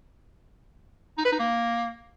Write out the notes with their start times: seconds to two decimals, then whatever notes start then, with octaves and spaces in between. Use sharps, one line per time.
1.18 D#4
1.25 B4
1.32 D#4
1.39 A#3